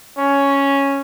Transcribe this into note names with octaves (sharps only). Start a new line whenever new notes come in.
C#4